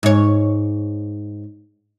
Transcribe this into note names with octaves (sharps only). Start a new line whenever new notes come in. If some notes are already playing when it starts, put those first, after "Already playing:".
G#2 C#5